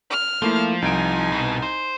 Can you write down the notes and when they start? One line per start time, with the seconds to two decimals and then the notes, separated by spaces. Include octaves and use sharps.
0.10 F6
0.42 F3 A3 A#3 E4
0.82 C2 D#4 G#5 D7
1.32 B2
1.62 C5